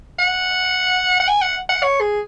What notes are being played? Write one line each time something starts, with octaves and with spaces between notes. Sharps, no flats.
F#5
F#5
G#5
F#5
F#5
C#5
G#4